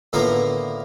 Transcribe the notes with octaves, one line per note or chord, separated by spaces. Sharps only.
A2 D3 A#3 B3 F4 A#4